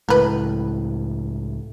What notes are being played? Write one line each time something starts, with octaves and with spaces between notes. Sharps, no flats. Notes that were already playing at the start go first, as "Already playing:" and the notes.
C#2 A2 A#4 B4